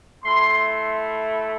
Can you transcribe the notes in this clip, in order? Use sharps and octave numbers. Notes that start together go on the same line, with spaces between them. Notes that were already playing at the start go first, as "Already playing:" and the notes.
A3 E4 C6